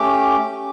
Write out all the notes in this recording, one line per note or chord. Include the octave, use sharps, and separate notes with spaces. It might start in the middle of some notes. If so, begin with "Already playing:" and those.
Already playing: A3 C#4 G4 D6
A3 C#4 G4